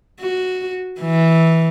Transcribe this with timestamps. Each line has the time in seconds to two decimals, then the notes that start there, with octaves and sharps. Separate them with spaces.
0.21 F#4
1.00 E3